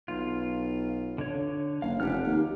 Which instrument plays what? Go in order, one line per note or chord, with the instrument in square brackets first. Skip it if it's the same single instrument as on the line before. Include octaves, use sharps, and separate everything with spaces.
[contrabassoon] B1 [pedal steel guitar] F4
[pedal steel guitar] D3 C#5
[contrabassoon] F#1 [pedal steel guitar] F5
[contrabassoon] F1 [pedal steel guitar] G4 F#5 F6
[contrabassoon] D#2